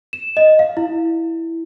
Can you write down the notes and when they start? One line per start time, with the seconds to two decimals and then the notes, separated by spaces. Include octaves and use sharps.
0.13 E7
0.37 D#5
0.59 F5
0.77 E4